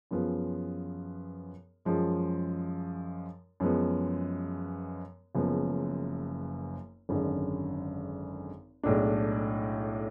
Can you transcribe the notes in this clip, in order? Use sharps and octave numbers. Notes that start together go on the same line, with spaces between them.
F#2 F3 B3 F4 G#4
F#2 F3 G#3
F#2 F3 G#3 B3
F#1 F#2 F3 G#3 B3
G#1 F#2 D3 G#3
B1 A2 G#3 D4